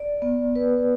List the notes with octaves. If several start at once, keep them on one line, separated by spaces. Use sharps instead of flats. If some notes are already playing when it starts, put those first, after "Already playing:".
Already playing: D5
B3
B4